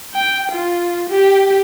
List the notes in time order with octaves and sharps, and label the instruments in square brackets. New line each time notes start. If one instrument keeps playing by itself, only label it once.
[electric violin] G5
F4
G4